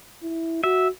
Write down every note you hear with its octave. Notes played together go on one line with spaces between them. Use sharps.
E4
F#4 E5